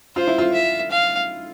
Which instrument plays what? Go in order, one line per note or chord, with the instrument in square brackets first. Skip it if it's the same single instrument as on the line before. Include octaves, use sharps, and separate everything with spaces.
[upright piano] F4 [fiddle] C5
[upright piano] E4
F4
[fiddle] E5
F5